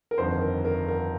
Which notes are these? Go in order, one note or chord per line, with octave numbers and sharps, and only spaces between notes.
A#4
G1 F2 D#3 C5
A#4
A#4
A#4